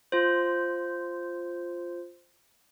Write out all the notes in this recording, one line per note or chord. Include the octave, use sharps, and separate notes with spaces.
F4 C5